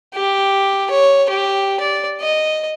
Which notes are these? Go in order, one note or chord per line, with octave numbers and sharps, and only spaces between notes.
G4
C#5
G4
D5
D#5